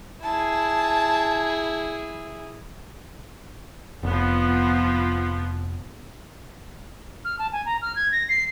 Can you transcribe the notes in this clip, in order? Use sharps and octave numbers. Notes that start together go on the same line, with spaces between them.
E4 G#4 A5
F1 F3 B3
F6
A5
G#5
A#5
F6
G#6
A#6
C7